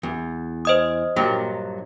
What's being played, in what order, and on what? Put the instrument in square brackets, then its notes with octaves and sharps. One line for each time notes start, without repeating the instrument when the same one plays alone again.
[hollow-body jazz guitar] E2
[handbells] C5 D#5 D#6
[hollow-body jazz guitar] G2 A#2 F#3